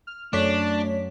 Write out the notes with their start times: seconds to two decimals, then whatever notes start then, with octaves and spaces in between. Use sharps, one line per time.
0.07 F6
0.33 F#2 A3 D4 C#5 B6